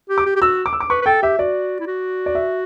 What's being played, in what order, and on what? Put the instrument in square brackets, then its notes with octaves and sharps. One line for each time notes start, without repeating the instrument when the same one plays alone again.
[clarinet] G4
[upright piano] D6
[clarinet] G4
G4
[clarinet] F#4 [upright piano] E6
[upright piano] D6
E6
D6
[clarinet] B4 [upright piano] C#6
[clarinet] B4
[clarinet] A4 [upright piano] G5
[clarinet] G4 [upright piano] E5
[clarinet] F#4 [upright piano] D5
[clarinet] E4
F#4
[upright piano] D5
E5